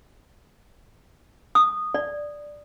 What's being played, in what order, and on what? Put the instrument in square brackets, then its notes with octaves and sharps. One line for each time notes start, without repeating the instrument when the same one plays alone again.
[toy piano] D#6
D5